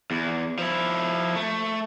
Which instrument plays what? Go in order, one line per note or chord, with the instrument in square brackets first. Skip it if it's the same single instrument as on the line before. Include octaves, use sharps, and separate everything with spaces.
[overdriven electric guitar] E2
F3 E4
A3